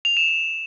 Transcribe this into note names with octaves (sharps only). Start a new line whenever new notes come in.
F7
E7
F7